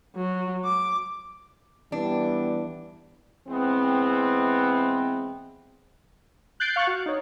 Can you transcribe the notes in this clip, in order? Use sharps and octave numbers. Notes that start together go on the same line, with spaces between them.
F#3
D6
E3 G3 B3 D4
E3 G#3 B3 C4
F#6 G6 A6 C7 D7
F5 C#6 F#6 A6
F#4
D#4 C#5